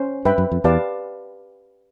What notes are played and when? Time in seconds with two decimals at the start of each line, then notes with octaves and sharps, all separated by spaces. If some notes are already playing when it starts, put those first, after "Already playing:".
Already playing: C#4 C5
0.25 G2 B4 E5 G5 B5
0.38 F#2
0.52 F2
0.64 E2 G4 B4 D5 F5 A5